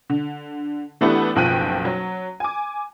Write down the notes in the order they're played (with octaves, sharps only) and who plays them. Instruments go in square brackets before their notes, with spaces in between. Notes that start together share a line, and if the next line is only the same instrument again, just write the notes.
[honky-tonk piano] D3
E3 A3 B3 D4 E4 G4
F#1 B1 F3 G5 F#6 D#7
F#3
G#5 D6